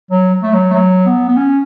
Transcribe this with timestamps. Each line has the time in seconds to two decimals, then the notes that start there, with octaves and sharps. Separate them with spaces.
0.11 F#3
0.43 A3
0.53 F#3
0.70 A3
0.74 F#3
1.06 B3
1.28 B3
1.37 C#4